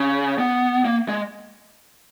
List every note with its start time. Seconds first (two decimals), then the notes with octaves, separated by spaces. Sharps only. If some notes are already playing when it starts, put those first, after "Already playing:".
Already playing: C#3
0.39 B3
0.85 A#3
1.09 G#3